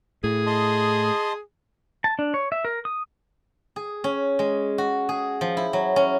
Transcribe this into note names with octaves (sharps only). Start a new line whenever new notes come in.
A2 G#4
D#5 A5 C6
A5
D4
C#5
E5
A#4
D#6
G#4
C#4
G#3
F#4
G#4
F3
E4
F#3
C#4